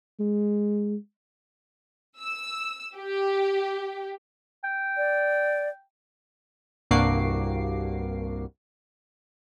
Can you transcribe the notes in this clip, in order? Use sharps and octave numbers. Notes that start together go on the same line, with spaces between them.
G#3
E6
G4
G5
D5
C2 G2 A#3 F#4 D6 C7